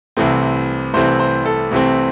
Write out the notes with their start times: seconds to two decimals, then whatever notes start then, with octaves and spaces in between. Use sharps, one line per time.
0.17 C2 C3 E3 A3 C4
0.94 C2 C3 E3 A3 C4 C5
1.20 C5
1.46 A4
1.71 C2 C3 E3 A3 C4